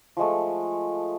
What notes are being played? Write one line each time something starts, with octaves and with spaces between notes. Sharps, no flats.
F3 G#3 A3